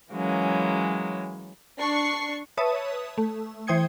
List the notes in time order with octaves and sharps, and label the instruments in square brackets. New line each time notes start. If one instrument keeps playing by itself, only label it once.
[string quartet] E3 F#3 G#3 A#3 C#4
[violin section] D4 C#6 C7
[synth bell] B4 C#5 E5 A5 D#6
A3
E3 C5 G5 D#6 G#6 C#7